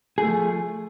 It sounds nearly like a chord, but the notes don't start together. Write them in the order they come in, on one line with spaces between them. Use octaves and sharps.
G#4 A3 F3